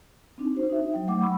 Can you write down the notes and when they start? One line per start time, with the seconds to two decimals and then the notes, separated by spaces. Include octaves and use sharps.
0.38 C4 D4 D#4
0.53 D#4 F#4 C5
0.70 D#4 E5
0.93 F#3 G5
1.07 F#3 A3 F#5 D6
1.22 B5 C#6 E6